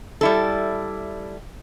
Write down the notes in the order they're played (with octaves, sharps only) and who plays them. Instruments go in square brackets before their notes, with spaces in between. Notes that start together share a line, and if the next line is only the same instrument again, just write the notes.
[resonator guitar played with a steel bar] G3 E4 A4